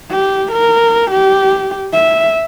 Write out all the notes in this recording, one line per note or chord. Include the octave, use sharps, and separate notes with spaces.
G4
A#4
G4
E5